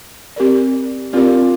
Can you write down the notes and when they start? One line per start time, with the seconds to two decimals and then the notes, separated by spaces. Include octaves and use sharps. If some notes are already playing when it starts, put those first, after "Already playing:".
0.36 C4 G4 A#4 D5
1.13 C4 D4 F4 G4 A#4 D5